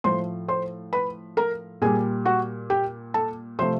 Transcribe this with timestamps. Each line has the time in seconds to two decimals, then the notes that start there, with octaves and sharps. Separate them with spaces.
0.04 A2 F3 A3 C5 C6
0.48 C5 C6
0.93 B4 B5
1.37 A#4 A#5
1.82 A#2 G3 G#4 G#5
2.25 F#4 F#5
2.70 G4 G5
3.14 A4 A5
3.59 C3 F3 A3 C5 C6